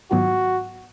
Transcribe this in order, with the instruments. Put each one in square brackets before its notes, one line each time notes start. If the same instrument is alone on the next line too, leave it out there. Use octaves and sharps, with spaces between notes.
[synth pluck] G#2 D#3 F#3 B3 F4 [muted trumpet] F#4